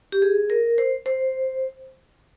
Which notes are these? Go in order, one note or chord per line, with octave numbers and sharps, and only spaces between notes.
G4
G#4
A#4
C5
C5